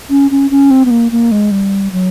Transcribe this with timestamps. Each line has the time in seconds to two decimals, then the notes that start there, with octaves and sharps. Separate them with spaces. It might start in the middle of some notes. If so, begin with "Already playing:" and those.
0.10 C#4
0.31 C#4
0.51 C#4
0.71 C4
0.85 B3
0.91 A#3
1.12 A#3
1.32 G#3
1.51 G3
1.92 F#3